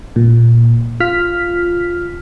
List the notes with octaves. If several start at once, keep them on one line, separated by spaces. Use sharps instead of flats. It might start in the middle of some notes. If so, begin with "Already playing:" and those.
A#2
F4 F6 B6